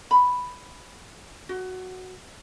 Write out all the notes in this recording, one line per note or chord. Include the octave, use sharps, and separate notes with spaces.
B5
F#4